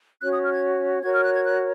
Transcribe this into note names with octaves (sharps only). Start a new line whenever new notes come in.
C#4 F#4 C#5 F#6
D#6
F6
G#6
F#4 A#4 C#5 G#6
F6
F#6
G#6
F#6